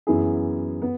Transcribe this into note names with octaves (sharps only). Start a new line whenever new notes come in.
F#2 E3 B3 E4 G#4
B3